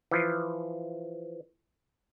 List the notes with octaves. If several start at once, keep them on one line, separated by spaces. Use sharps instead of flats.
E3 F3